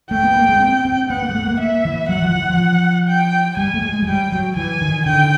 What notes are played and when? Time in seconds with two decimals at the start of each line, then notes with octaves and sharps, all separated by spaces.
0.11 A3 G5
0.24 B3
0.36 A#3
0.49 G#3
0.60 C4
0.85 C4
1.10 B3 F#5
1.23 A#3
1.29 G#3
1.35 A3
1.47 A#3
1.59 A#3 E5
1.85 E3
2.09 F#3 F#5
2.22 F3
2.35 E3
2.50 F3
3.08 G5
3.57 G3 G#5
3.74 A3
3.82 G#3
4.02 F#3
4.07 G3 G5
4.32 F#3
4.56 E3 G#5
4.81 D#3
5.06 D3 G5